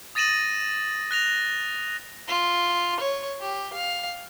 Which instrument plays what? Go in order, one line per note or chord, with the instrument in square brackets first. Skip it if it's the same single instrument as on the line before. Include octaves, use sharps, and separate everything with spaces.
[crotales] D#6 A6 A#6 D#7 E7 F#7
F#6 A#6 F7
[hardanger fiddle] F4
C#5
G4
F5